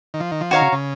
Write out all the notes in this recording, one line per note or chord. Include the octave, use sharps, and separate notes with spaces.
D#3
F3
D#3
F3
D#3 F#4 C#5 F5 A#5
C#3
C#3